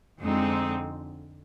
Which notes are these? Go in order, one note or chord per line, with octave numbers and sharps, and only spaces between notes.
F2 D3 G#3 C4 D#4